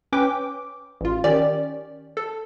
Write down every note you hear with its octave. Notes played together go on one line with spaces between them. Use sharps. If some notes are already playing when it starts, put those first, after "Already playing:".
C#4 B4 G5 D6
A1 F4
D#3 C#4 G4 D5
A4